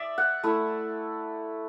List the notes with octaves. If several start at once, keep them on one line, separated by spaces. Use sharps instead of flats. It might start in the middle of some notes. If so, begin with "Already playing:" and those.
Already playing: D5 E5
F#5
A3 E4